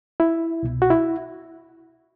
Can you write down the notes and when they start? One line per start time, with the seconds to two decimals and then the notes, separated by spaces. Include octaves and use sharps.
0.20 E4
0.63 C2 B2
0.82 F#4
0.90 E4